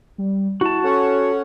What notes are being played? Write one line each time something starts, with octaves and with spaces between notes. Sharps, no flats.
G3
E4 F#4 A5
C#4 A4 C#5 F#5